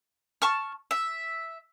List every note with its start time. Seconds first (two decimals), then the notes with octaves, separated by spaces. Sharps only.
0.42 A5 C#6 F6
0.91 E5